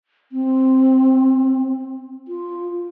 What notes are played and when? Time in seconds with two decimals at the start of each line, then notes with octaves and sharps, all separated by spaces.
0.32 C4
2.28 F4